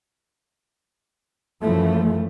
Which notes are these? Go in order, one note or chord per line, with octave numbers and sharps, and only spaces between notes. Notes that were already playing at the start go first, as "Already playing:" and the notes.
F#2 E3 F3 A3